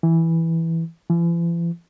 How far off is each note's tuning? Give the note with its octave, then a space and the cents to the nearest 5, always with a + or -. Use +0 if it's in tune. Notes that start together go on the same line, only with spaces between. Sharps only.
E3 -5
E3 +45